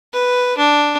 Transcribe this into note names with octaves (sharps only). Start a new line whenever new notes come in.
B4
D4